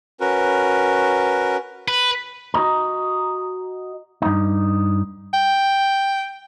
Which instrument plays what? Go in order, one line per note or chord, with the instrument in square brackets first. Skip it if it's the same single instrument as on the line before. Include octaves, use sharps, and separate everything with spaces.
[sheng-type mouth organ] C#4 F#4 A#4 B4
[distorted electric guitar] B4
[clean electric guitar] F#4 D#5 A#5
G2 D#4
[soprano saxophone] G5